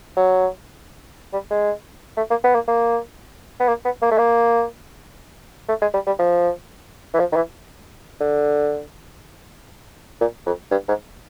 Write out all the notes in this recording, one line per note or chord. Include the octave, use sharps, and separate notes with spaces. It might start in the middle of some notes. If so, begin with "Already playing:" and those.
F#3
G3
G#3
A3
A#3
B3
A#3
A#3
B3
A#3
B3
A#3
A3
A#3
A3
G#3
G3
G3
F3
E3
F3
D#3
E3
D3
A#2
F2
G2
G#2